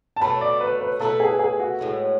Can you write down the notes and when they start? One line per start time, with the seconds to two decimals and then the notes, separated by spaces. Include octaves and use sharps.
0.16 A5
0.21 B2 F#3 A3 B5
0.41 D5
0.61 B4
0.81 B4
1.00 B2 A3 E4 A4 B4
1.20 G#4
1.39 G#4
1.60 F#4
1.79 A2 G#3 B3